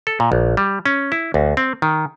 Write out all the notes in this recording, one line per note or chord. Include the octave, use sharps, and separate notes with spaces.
A4
A#2
A#1
G3
C#4
E4
D2
C4
D#3